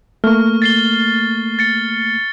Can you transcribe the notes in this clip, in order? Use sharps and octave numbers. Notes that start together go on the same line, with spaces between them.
A3 A#3 C#6 F6
A6 C7 G7
A6 C#7